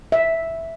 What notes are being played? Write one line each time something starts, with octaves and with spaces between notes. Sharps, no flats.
E5